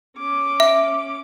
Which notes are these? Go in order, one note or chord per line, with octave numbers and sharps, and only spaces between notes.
C#4 D6
E5